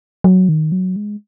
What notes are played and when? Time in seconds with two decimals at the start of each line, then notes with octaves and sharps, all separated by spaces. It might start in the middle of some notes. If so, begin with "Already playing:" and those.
0.24 F#3
0.49 D#3
0.72 F#3
0.96 G#3